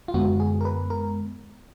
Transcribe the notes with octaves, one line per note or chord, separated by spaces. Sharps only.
F4
F#2 D3 G#3 B3 F#4
G#4
A#4
B4
A#4